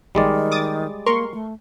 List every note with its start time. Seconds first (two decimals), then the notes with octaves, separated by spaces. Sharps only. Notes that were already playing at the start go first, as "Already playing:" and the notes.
0.15 A#1 D#3 G3 G#3 D5
0.51 D6 D#6 A6
1.06 A#3 A#4 C6 C#6
1.34 A3